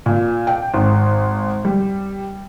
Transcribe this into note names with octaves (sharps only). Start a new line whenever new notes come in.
A#2
G5
G#1
G3